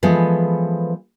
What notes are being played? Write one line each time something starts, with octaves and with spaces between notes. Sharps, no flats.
E3 F3 G#3 B3 G#4 A4